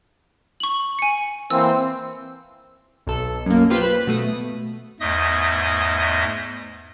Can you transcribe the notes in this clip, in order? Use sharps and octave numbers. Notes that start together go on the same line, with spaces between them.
C#6 F#7
G#5 C#7
E3 A#3 C4 E6
B1 A4
F#2 A#3
F4 G4 B4 C5 F5 G5
B4 B5
B2 A3 D#6
E2 G#2 A3 D#5 D#6